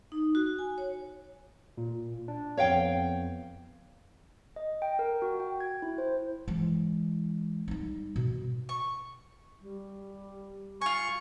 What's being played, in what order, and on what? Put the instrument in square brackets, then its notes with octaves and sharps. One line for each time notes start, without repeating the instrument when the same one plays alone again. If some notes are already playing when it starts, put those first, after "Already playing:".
[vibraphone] D#4
F#4
G#5
C#5
[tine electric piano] A#2
D4
[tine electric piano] F2 B3 [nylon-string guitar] C#5 F5 G5
[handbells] D#5
G5
A#4
F#4
G5
G#6
E4
C5
[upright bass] E3 G#3
G3 D#4
B2
[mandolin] C#6
[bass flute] G3
[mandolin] F4 G#5 [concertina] C#6